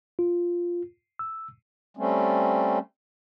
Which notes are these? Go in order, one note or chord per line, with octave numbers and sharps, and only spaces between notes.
F4
E6
G3 A3 C4 C#4